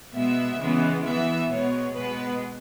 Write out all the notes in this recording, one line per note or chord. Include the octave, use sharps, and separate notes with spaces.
B2 G#3 B3 E5
C#3 E3 G#3 B3
E3 B3 E5
B2 G#3 B3 C#5
B2 G#3 B3 B4